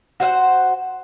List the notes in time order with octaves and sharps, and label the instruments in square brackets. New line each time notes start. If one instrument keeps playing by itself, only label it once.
[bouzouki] F#4 C5 F5 F#5